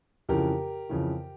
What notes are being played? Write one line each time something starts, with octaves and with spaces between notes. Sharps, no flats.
F2 C#3 E3 G4 A#4
F2 C#3 E3